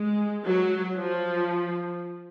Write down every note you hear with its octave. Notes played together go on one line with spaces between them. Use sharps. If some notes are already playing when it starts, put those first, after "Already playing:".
Already playing: G#3
F#3
F3